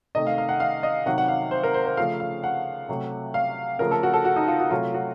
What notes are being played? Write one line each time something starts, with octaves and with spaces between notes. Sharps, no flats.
C3 D#3 A3 D#5
F5
F5
F#5
F5
D#5
C3 D#3 F#3 F#5
F#5
F5
C5
A#4
C5
C5
C#3 F3 A3 F5
F5
F#5
C3 F#3 A3
F5
C#3 F3 A3 A#4
A4
F#4
A4
F#4
D#4
F4
F#4
C3 F#3 A3 F4
F#4